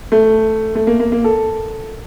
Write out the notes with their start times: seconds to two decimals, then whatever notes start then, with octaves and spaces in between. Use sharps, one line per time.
0.12 A3
0.75 A3
0.87 A#3
1.00 A#3
1.12 A#3
1.24 A4